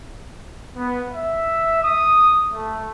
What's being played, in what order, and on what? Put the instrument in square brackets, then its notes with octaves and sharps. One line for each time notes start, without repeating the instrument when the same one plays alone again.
[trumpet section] B3
E5
D#6
A3